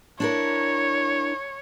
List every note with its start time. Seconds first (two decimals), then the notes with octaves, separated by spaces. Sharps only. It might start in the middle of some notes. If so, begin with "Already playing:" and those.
0.20 D4 E4 A#4 C#5